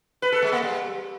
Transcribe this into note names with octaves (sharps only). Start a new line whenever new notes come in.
B4
A4
G#3
A#3
G3